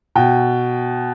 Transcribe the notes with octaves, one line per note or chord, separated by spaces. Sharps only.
B2 G5